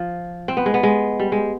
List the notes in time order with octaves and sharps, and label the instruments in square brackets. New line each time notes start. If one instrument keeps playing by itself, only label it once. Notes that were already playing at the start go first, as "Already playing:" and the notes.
Already playing: [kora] F3
C4
B3
G#3
B3
G#3
G3
G#3